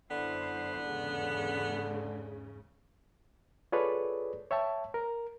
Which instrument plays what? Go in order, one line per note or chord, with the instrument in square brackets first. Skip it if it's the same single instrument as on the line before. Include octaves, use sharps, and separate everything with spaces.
[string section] F#2 E4 C5 [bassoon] D3 [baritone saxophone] B3
[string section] E2 G#2 C#3
[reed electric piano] F4 G#4 A4 B4 C#5 D5
C#5 E5 G5 A5
A#4